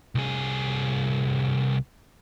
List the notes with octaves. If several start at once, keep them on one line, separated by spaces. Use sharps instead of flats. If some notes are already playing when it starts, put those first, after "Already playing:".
C2 G#4